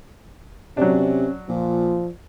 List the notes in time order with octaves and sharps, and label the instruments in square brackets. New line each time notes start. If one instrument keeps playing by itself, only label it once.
[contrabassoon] C3 [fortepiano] F#3 D4 [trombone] C#4
[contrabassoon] A#2 [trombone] F3